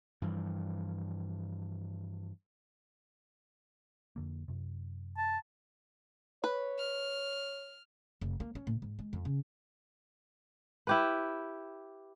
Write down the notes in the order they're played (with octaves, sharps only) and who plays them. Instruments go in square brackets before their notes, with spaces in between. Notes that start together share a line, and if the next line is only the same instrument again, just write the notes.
[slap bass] G2 E3 F3
[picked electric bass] F2 D3 A#3
F#2 C3
[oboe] A5
[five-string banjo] B4 [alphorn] C#5
[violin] F6
[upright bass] F1
A#3
C#4
A2
G#2
G#3
F2
C#3
[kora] E4 G4 B4